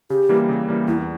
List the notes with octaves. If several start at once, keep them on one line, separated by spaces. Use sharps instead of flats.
C#3 G4
E3 G3 A#3
C#3
E3 G3 A#3
E2 E4